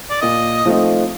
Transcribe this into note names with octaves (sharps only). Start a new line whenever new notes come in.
D5
A#2 D#5
F3 A3 C4 D#4